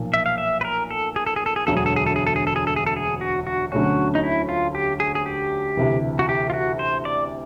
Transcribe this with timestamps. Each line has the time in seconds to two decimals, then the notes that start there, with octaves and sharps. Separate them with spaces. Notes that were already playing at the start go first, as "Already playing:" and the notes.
Already playing: B1 A#2 F3
0.14 E5
0.26 F5
0.38 E5
0.61 B4
0.65 A#4
0.91 A4
1.16 G#4
1.26 A4
1.36 G#4
1.46 A4
1.56 G#4
1.67 E1 D2 D3 F#3 A4
1.77 G#4
1.86 A4
1.96 G#4
2.06 A4
2.16 G#4
2.27 A4
2.36 G#4
2.47 A4
2.56 G#4
2.67 A4
2.76 G#4
2.86 A4
2.96 G#4
3.21 F#4
3.47 F#4
3.72 D2 D3 F#3 A3 C#4 F#4
4.15 D#4
4.23 E4
4.49 F4
4.75 G4
5.00 G#4
5.15 G#4
5.26 G4
5.77 D2 C3 E3
6.19 F#4
6.29 G4
6.50 F4
6.54 F#4
6.79 C5
7.05 D5